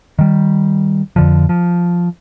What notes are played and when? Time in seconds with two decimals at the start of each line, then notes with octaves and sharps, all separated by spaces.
0.19 D#3 G3
1.16 F2 D3 F3
1.49 F3